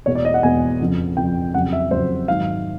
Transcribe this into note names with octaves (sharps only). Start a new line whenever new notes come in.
E2 B2 G#3 C#5
D5
D#5
F#5
E2 B2 G#3 G#5
F2 C#3 F3
F2 C#3 F3 G5
F2 C#3 F#3 F#5
E5
F2 C#3 F#3 C5
G#2 D#3 F#3 F5